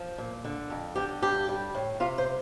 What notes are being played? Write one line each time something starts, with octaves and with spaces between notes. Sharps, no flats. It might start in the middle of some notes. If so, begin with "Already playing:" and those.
Already playing: F3
A#2
D3
F2
D3 G4
G2 G4
G3
A2
C3 F4
C5